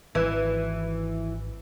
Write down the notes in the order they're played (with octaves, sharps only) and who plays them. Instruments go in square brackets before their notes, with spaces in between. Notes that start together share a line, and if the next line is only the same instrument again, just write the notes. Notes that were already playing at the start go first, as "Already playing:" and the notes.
[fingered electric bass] G#1 [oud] E3